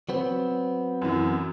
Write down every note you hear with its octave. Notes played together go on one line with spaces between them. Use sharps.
F#3 B3 C4
F#2 E3